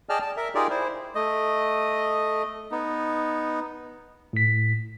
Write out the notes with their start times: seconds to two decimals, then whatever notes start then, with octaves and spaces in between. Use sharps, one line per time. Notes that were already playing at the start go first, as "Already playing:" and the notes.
0.09 G#4 D5 D#5 G5 A5 F6
0.22 A5
0.37 A#4 E5
0.55 D#4 F4 G4 G#4 A#4 D5
0.70 E4 C5
1.15 A3 D#5
2.72 B3 D#4
4.33 A2 B6